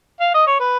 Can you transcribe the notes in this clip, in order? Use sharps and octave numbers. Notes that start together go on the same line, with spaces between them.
F5
D#5
C#5
B4